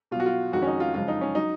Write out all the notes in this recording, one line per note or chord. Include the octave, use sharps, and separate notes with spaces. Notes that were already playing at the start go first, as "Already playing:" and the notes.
B2 F#3 F4 F#4
F4
F2 D#3 G#3 F#4
C#4
D#4
F4
F#2 C#3 F3 G#3 F4
D#4
C#4
F#3 D#4